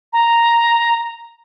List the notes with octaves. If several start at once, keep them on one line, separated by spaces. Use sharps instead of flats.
A#5